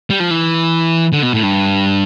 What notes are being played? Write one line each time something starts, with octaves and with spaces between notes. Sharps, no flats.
G3
F3
E3
D3
B2
A2
G2